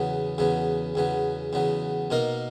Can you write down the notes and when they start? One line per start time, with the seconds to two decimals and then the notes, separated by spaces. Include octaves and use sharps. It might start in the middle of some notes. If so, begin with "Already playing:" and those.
Already playing: E2 C#3 F#3 B3
0.38 E2 C#3 F#3 B3
0.95 E2 C#3 F#3 B3
1.53 E2 C#3 F#3 B3
2.10 B2 A#3 D#4 A#4